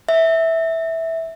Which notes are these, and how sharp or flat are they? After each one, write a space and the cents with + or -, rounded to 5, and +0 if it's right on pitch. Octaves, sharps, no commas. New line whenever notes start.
E5 -10